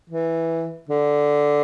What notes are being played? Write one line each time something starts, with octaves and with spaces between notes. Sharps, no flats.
E3
D3